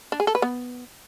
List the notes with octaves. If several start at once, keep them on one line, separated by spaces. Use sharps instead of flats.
D4
G#4
A4
B4
B3